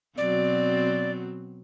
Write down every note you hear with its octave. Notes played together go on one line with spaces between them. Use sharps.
B2 F#3 C4 D5